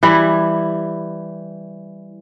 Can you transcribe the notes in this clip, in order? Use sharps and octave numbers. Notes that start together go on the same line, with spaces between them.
E3 G3 E4